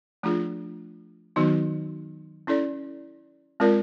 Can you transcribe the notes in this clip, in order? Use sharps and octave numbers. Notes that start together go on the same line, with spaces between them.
F3 A3 D4 F4 G#4
D#3 F#3 B3 D#4 F#4
C#4 E4 A4 D5
G#3 C4 F4 A#4 D5